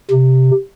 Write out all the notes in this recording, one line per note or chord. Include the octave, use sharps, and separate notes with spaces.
C3